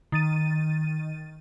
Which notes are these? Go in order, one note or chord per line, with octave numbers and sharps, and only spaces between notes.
D#3 A6 D#7